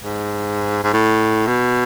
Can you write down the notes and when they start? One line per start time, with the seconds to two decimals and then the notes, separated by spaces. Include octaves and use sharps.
0.04 G#2
0.84 G#2
0.94 A2
1.47 B2